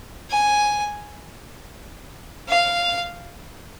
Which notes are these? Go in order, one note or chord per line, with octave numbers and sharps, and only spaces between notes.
G#5
F5